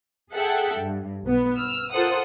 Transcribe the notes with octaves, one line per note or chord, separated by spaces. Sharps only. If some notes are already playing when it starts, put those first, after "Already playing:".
G#4 A4 E5 F#5 G5
G2
B1 B3
E6 F6
F4 A4 A#4 C5 F#5 D#6